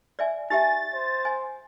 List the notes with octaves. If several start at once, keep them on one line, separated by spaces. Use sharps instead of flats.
D5 E5 G#5
D#4 G4 E5 G#5 A6
C5
G#5